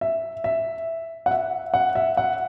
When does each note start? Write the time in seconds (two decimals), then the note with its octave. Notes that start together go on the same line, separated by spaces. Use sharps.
0.01 E5
0.44 E5
1.26 F#5
1.31 E5
1.74 F#5
1.95 E5
2.17 F#5